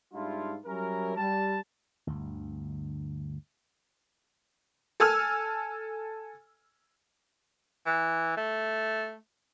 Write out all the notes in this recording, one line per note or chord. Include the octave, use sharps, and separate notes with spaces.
G#2 G3 D4 E4 F4
F#3 G3 C#4 E4 A#4
G3 A5
G1 D2
A4 G#5 E6 F6
E3
A3